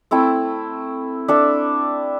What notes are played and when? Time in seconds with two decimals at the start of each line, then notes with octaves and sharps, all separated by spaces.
0.11 A3 C4 E4 A4
1.28 D4 A4 E5